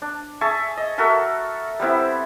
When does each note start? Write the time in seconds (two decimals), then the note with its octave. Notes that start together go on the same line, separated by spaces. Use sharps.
0.02 D4
0.41 G#4 E5 A5 C#6
0.77 D#5
0.98 F#4 A4 A#4 E5
1.79 G3 B3 C4 E4